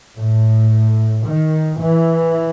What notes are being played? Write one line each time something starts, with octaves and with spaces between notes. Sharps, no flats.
A2
D#3
E3